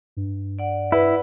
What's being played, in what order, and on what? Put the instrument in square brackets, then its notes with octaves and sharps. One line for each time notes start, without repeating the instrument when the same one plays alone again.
[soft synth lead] G2
[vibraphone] D5 F#5
[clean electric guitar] E4 [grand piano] B4